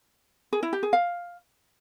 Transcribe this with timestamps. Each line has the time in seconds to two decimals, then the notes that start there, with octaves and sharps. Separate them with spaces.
0.53 G#4
0.63 E4
0.73 G4
0.83 G#4
0.93 F5